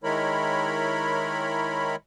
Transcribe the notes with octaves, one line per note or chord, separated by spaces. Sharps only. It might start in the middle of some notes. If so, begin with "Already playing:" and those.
D#3 G#3 E4 A#4 C#5 B5